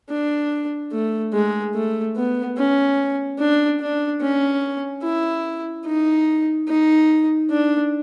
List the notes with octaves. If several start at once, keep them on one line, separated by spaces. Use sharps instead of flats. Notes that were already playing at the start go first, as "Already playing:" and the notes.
D4
A3
G#3
A3
B3
C#4
D4
D4
C#4
E4
D#4
D#4
D4